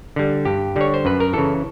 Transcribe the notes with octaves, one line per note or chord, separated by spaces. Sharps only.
D3 G3
G2 G4
D3 G3 C#5
C5
F#2 B4
A#4
C#3 E3 A4